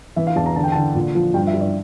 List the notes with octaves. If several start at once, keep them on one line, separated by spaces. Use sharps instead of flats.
E3 E5
F5
E2 A5
A#5
D3 A5
G5
D3 A5
A#2
F3
G2 G5
E5
G2
D5